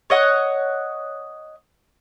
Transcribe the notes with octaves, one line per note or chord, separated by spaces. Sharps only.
C#5 D#5 F#5